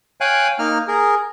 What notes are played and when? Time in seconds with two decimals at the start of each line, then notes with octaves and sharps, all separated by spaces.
0.21 C#5 F5 G5 G#5 F#6
0.59 A#3 D#4 F6
0.88 G#4 A#4